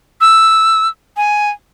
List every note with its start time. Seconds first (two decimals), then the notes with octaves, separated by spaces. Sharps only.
0.21 E6
1.17 G#5